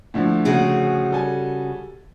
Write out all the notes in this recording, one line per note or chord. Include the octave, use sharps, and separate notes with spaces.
A2 D3 F3
C#3 F#4 G#4
G3 A4 G#5